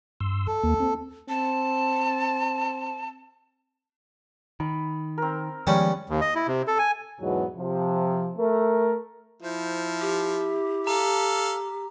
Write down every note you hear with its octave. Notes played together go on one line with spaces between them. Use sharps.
G2 C6 E6
A4
D#2 A#3
C4
C4 A5
D#3 B5
C4 A#4
D#3 F3 G3 G#3 B3 C#4
D#2
D#5
E4
C3
A4
G#5
E2 G#2 B2 F#3 B3
C3 F3
A3 A#4
F3 E4 C5
G4
A4 F5 A#5